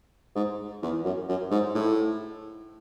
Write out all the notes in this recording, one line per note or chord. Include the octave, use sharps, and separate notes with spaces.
G#2
E2
F#2
F#2
G#2
A2